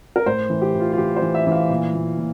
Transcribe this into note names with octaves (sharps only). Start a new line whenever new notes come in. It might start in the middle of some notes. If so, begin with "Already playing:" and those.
A#4
A2 C5
E3
G4
E3
F4
F4
E3 G4
C5
E3
E5
E3
F5
A#2
A#2
A#2